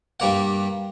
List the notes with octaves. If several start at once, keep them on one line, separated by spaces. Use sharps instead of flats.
G2 G3 A#3 F#5